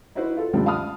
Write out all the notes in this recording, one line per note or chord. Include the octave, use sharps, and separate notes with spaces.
D#4 E4 F#4 B4 C5
F4 A4
C#2 F#2 D3 F3 G3 A3
F5 A5 B5 D#6 F6